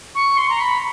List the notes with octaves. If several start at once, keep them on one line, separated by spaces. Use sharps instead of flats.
C#6
C6
A#5
B5